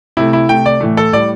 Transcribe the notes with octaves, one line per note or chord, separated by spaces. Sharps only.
C3 A3 E4
E4
C3 A3 G5
D5
A2 E3 A3
A4
A2 G3 D5